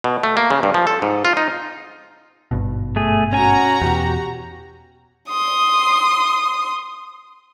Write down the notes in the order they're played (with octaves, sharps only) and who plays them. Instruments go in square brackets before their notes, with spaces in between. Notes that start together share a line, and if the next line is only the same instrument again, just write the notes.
[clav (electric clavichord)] B2
A3
A#3
C#3
G2
F3
A4
G#2
F4
D#4
[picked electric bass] G#1 G2 B2
[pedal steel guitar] A3 G#4
[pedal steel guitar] C#4 G#5 [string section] F#4 A#5
[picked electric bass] E2 B2 [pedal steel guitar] G4
[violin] C6 D#6